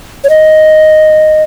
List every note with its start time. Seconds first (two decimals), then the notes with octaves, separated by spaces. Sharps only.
0.24 C#5
0.30 D#5